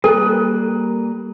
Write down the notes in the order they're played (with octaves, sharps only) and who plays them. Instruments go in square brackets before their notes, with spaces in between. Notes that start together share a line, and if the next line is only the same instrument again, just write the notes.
[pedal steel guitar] G3 A#3 F#6 [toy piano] A4